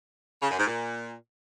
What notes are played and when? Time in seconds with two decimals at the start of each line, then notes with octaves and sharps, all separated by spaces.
0.42 C#3
0.50 F#2
0.59 G#2
0.67 A#2